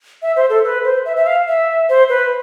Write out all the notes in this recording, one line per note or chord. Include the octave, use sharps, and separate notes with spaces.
E5
C5
A4
B4
C5
E5
E5
F5
E5
C5
B4